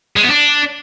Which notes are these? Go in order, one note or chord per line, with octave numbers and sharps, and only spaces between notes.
G#3
B3
D4